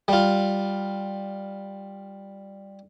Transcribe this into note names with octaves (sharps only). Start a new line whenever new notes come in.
G3 F4